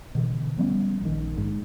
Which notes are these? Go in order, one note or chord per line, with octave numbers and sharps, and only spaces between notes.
B2 D3 E3
F3 G3 B3 C#4
A#1 D#3
G#2